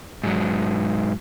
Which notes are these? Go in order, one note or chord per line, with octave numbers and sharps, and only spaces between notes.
G#2 F#3